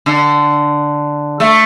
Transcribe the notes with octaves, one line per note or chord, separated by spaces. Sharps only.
D3
A3